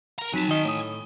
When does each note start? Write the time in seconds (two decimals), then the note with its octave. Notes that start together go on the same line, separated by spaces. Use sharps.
0.19 A#4 A#5
0.33 F2 F#3 D#4 G#5 A5 B6
0.48 D#3 D#5
0.65 A2 C#5 D#6